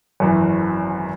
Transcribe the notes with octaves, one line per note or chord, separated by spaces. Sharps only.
G#1 F#2 E3